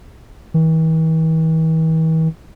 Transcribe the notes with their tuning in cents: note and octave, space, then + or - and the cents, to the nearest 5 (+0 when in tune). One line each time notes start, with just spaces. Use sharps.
E3 -45